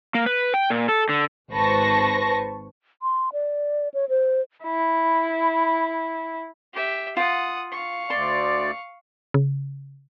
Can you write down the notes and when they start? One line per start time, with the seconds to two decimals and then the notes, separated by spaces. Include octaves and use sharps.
0.14 A#3
0.26 B4
0.54 G5
0.70 A#2
0.88 A4
1.09 D3
1.51 G#1 B4 C5 A5 C#6 A#6
3.02 C6
3.33 D5
3.94 C#5
4.09 C5
4.64 E4 B5
6.73 G4 E5
7.17 F4 F#5 D#6
7.72 F5 C#6
8.10 D2 D5 C6
9.34 C#3